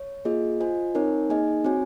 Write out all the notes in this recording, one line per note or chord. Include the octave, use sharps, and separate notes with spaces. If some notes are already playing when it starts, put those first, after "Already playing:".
Already playing: C#5
A#3 F4 G#4 D#5
F4 C5 D#5 G#5
C4 D#4 A#4 C#5 G#5
A#3 D#4 G#4 D#5 G#5
C4 F#4 C#5 G#5